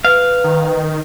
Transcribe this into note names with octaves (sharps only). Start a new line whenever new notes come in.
B4 F5
D#3